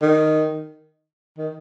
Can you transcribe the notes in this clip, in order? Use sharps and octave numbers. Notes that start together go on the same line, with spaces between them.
D#3
D#3